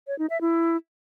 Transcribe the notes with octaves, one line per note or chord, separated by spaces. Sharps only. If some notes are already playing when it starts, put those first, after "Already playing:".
C#5
D#4
E5
E4